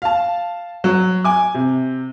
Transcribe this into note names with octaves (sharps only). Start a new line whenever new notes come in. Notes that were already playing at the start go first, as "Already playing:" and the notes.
F5 A5
F#3
G#5 D6
C3